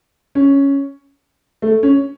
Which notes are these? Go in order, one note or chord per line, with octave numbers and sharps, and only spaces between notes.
C#4
A3
C#4